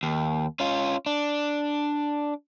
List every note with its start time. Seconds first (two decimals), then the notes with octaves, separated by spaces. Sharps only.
0.03 D#2
0.60 C#4 F4
1.06 D4